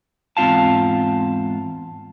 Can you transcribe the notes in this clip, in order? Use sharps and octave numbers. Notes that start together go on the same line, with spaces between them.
E2 G#2 C4 F4 F5 A5